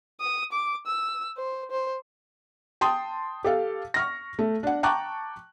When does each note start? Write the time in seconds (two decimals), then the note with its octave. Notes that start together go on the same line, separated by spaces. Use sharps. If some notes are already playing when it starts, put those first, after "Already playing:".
0.20 D#6
0.52 D6
0.87 E6
1.37 C5
1.71 C5
2.81 G5 A5 C6 D#6
3.44 G4 A4 F5
3.94 C#6 F6 A#6
4.39 A3
4.63 D4 F#5
4.83 G5 A5 A#5 C#6 D6 F#6